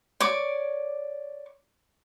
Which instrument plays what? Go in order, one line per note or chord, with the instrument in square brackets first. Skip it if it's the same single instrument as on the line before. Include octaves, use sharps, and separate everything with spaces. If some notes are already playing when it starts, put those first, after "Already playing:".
[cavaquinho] C#5 D5 D6